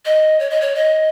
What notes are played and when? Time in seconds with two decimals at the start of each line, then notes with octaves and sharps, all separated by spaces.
0.05 D#5
0.39 C#5
0.50 D#5
0.61 C#5
0.75 D#5